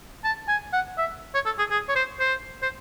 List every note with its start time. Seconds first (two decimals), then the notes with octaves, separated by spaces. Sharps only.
0.25 A5
0.48 G#5
0.73 F#5
0.98 E5
1.35 C#5
1.46 A4
1.59 G#4
1.71 G#4
1.89 C#5
1.96 C5
2.20 C5
2.62 C5